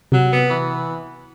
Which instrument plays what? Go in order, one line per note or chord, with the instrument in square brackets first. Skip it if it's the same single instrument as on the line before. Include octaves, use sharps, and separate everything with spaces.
[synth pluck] C3 [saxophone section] F#3
[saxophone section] B3
E3